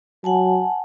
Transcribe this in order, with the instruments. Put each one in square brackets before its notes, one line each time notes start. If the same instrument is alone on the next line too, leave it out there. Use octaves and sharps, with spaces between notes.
[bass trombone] F#3 [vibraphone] F#5 G#5 A5